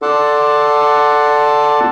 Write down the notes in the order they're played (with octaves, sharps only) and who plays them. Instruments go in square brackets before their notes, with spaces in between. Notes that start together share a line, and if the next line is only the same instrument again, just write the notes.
[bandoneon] A4 D5 F#5 A5 C6 D6